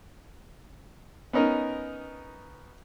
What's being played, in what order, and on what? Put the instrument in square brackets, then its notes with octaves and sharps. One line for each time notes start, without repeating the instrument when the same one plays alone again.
[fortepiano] B3 C#4 D#4 A#4